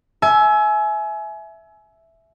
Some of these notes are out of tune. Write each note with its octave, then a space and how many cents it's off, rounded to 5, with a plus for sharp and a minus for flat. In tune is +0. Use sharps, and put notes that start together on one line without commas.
E5 +0 G#5 +30